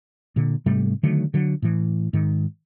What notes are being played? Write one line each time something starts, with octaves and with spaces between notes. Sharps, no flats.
A#2 D3
G#2 C3 G3 A3
D3 D#3 F#3 A3
D3 F#3
A2 E3
G#2 D#3